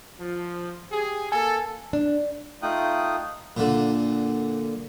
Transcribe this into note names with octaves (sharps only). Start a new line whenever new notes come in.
F3
G4 G#4
A#3 A4 G#5
D4
A3 D#4 F4 G5 D#6 F#6
A#2 D3